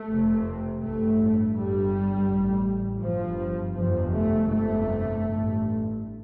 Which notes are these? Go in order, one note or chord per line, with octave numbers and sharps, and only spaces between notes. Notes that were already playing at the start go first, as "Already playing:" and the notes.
Already playing: A3
F1 F2 C3
A1 G2 A3
G1 G2 G3
A1 A2
G1 G2 F3
G1 F2 C3 F3
A3
G1 F2 C3 A3
A1 G2